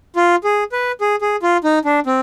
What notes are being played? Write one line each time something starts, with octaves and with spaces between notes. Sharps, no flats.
F4
G#4
B4
G#4
G#4
F4
D#4
D4
C4